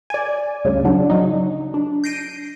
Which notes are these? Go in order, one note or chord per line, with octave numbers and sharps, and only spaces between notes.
D5 G#5
D2 G2 C#3
C#3 F#3 D4
F#3 D#4
D4
G6 A#6 C7 D7 D#7